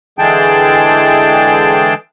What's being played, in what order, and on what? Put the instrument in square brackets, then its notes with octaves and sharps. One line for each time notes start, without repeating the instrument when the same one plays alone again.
[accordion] D3 E3 G#3 G#4 G5 A5